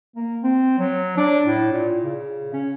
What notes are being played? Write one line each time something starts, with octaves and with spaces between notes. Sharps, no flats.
A#3
C4
F#3
D4
A2
A#2
C#3
C#4